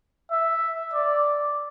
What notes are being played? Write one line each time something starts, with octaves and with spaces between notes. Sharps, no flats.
E5
D5